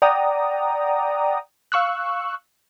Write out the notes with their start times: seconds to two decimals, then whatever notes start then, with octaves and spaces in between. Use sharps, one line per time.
0.02 D5 F#5 G5 A#5 D#6
1.72 F5 C#6 E6 F#6